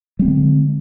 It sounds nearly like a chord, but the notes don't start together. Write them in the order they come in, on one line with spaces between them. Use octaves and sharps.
G3 C4 G#3 D3